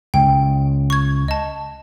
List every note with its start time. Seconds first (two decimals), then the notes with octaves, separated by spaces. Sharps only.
0.14 C#2 G5
0.90 C#6 G#6
1.28 D#5 A5